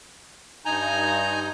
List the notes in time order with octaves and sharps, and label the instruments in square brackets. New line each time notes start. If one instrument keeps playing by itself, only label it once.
[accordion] G2 D#4 G6 [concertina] G#5 A#5